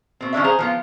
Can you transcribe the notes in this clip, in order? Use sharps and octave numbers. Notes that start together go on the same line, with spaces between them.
B2 C4
F3 C#4 D4 E5
G#4 C5 A#5
F3 B3 F4